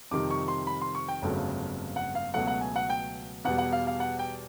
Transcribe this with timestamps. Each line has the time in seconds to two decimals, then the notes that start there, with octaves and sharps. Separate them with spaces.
0.11 F2 C3 D#3 G3 D6
0.30 C#6
0.48 C6
0.67 B5
0.81 C6
0.95 C#6
1.08 G5
1.22 G1 F2 C#3 F#3 A3
1.96 F#5
2.15 F5
2.33 C#2 B2 F#3 A3 F#5
2.47 F#5
2.61 G#5
2.76 F#5
2.90 G5
3.44 E2 B2 G3 F#5
3.58 F#5
3.72 F5
3.87 F5
4.00 F#5
4.19 G5